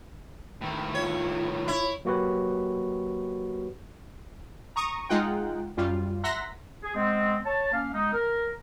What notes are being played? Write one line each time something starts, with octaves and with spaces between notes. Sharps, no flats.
A2 D#3
F4 C#5
E4 C#5
F#3 A#3 F#4 G4 B4 C#5
A#5 C#6 D#6
G#3 D#4 F4 F#5 G5
F#2 G3 F4
E5 F#5 A#5 C6 A#6 B6
G#4
G#3 B3 C4
C#5 A5
A#3 C#4 F5
G#3 B3 D#4
A#4